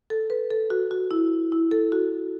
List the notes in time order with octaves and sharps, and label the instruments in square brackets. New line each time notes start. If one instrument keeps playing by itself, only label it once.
[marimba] A4
B4
A4
F#4
F#4
E4
E4
A4
F#4